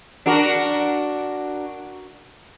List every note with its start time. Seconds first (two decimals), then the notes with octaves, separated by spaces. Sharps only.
0.26 D4 F#4 A#4